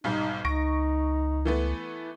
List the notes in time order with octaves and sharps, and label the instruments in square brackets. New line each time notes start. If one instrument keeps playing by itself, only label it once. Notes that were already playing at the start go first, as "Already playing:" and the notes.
[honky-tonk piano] B1 G#2 G3 [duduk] D#4
[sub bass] C#2 [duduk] D#4 [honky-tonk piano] C#6 A#6 D7
[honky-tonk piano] E3 A3 B3